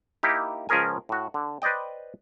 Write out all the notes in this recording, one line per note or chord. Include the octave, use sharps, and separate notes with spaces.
A#3 D#4 E4 G4
C#2 F3 C#4 G#4 A#4 G#5
A2 F#4
D3
B4 C5 D5 D#5 G5